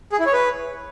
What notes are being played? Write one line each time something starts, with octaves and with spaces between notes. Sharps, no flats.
G#4
E4
C#5
B4